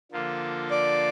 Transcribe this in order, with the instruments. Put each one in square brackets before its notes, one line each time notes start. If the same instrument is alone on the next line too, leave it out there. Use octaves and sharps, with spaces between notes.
[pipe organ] D3 F3 A#3 F4 A4
[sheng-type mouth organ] D5